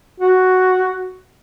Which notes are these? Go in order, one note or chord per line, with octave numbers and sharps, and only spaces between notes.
F#4